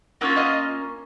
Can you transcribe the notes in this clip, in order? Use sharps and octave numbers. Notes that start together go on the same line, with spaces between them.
A#3 C#4 F4 E5 F#5
D#5 F5